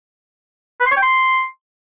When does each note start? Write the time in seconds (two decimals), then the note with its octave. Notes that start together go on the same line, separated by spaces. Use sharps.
0.80 B4
0.86 C6
0.91 C#5
0.97 G5
1.02 C6